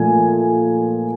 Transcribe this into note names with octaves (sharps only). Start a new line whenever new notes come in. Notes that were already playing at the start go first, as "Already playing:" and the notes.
Already playing: A#2 F3 A3 G#5